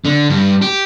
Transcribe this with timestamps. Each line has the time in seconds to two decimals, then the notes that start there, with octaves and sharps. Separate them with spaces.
0.05 D3
0.30 G2
0.62 G4